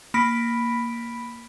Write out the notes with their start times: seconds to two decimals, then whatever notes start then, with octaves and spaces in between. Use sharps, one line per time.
0.14 A#3 B5 B6 D7